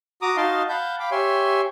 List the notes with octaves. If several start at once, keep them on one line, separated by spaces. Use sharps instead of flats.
F#4 A#5 D6 D#6
D#4 F#4 D#5 F5 A5 C6
F5 F#5 A5 B5 G6
F5 G5 B5 D6
G4 C#5 E5 G#5 C6